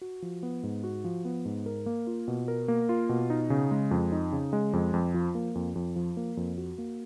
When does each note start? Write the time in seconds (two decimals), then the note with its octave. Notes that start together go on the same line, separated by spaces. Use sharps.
0.01 F#4
0.22 F3
0.43 B3
0.63 G#2
0.84 F#4
1.04 F3
1.25 B3
1.45 G#2
1.66 A#4
1.86 A#3
2.07 F4
2.28 B2
2.48 A#4
2.68 A#3
2.89 F4
3.09 B2
3.30 D#4
3.50 C#3
3.71 G#3
3.91 F2
4.12 D#4
4.32 C#3
4.53 G#3
4.73 F2
4.94 F2
5.14 F3
5.35 A#3
5.55 F2
5.76 F2
5.96 F3
6.17 A#3
6.37 F2
6.58 F#4
6.78 A#3